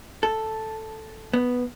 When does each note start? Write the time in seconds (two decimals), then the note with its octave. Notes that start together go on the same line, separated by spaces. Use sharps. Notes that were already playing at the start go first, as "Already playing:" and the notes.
0.23 A4
1.33 B3